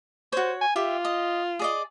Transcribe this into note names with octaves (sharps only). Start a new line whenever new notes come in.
F#4 C5 C#5
G#5
F4 G4 E5
D#5
G#4 D5 D#5